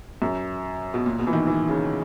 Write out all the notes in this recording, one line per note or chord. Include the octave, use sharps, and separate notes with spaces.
F#2
B2
A#2
B2
E3
D#3
E3
C#3